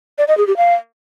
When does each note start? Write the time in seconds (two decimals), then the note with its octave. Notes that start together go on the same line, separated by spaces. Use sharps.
0.18 D5
0.28 D#5
0.38 G#4
0.47 G4
0.57 F5